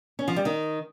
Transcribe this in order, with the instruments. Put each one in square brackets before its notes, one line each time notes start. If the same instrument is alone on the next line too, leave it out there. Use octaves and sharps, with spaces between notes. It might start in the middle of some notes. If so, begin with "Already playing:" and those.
[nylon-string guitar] C#4
F3
G3
D#3